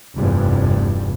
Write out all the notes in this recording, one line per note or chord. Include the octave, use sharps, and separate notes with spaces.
F1 E2 G2